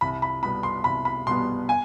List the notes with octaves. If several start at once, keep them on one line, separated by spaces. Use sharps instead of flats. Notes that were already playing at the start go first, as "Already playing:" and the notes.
C2 B5
B5
B2 G3 B3 B5
C6
C2 B5
B5
B2 G3 B3 C6
G#5